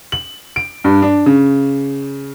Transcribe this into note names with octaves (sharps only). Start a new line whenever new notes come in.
F#7
D7
G2
D4
C#3